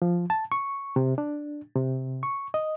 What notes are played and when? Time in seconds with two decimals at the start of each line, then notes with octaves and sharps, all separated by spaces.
0.02 F3
0.30 A5
0.52 C#6
0.96 C3
1.18 D4
1.75 C3
2.23 C#6
2.54 D#5